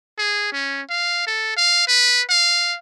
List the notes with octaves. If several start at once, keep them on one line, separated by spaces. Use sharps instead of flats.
G#4
C#4
F5
A4
F5
B4
F5